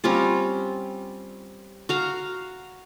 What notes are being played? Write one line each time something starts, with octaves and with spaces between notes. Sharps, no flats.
G3 C4 C#4 F4
F#4 F5 A#5